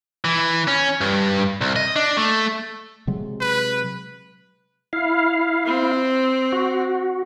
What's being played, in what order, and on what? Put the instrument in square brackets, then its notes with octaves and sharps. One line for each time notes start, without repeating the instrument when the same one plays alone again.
[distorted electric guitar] E3
C#4
G2
C2
D#5
D4
A3
[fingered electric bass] C3 F#3 G#3
[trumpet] B4
[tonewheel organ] E4 F5
[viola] C4
[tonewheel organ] F#4